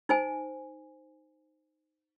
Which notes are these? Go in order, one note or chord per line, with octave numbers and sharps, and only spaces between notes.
D#4 C5 G#5